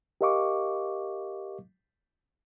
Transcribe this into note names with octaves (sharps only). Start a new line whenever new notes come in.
G4 A#4 D#5 F5 C#6 D6